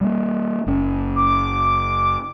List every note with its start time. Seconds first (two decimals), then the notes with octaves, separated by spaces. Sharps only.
0.01 G3 G#3 A#3
0.67 F#1 C#4
1.16 D6